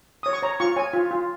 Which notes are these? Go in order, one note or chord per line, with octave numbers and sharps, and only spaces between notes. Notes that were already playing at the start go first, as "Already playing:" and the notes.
C#5 D#6
C#6
C#5 A#5
F4 C#6
C#5 G#5
F4
F4